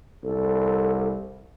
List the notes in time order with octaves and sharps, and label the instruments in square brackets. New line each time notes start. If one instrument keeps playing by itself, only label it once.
[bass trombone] C2 [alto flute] A4